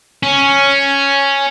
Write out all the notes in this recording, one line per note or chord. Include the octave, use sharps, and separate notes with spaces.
C#4